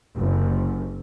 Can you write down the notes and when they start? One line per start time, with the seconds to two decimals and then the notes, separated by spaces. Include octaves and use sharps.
0.17 F#1 C3